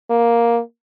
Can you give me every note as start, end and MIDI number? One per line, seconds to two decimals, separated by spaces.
0.10 0.60 58